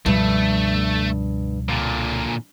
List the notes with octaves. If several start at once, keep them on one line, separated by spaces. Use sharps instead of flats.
C#2 G2 B2 F3 A3
A#2 D3